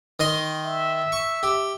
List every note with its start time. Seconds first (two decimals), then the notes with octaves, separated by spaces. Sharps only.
0.20 D#3 D#5 C6
0.66 E5
1.12 C#6
1.43 G4